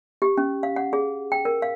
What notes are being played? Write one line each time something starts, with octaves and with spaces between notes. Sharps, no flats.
G4
C#4
F5
F#5
G#4
G5
A#4
F5